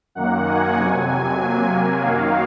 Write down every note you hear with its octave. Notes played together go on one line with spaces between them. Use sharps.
F#2 D#3 A#3 F#5
G#5
F2 C3 F#3
C3 F#3 A#3
F#2 D#3 F#3 A#3 F5